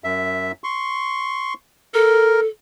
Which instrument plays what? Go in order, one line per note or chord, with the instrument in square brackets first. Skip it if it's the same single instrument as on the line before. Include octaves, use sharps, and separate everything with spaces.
[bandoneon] F#2 E5
C6 C#6
[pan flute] A4 [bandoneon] A#4